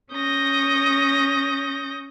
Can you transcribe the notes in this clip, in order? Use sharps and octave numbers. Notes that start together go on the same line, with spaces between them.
C#4 D#6 G6 A#6